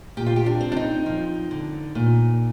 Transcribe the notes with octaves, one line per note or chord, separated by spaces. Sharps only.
A#2 G4
F4
G4
D4
C4
D4
D#4
F3
D3
A#2